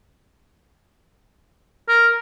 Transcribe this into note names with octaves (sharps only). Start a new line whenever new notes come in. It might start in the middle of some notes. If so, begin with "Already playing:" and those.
A#4